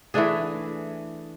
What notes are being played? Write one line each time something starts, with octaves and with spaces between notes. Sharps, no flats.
E3 A3 D4 G#4